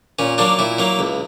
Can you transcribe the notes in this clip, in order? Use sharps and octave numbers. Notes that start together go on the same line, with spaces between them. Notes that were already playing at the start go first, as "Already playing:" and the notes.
A#2 C#4
F#3 A#3 D4
A#2 E4
F#3 A#3
C#2